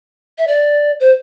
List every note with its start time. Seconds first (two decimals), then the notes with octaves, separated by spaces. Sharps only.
0.38 E5
0.48 D5
1.00 C5